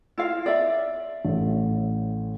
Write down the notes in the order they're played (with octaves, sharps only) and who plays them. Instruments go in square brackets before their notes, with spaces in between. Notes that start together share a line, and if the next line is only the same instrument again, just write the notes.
[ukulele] E4 F4 F5
D5 E5
[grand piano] A1 A2